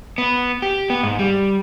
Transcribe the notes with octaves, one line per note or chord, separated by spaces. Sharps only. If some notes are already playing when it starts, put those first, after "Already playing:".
B3
G4
B3
G#2
G3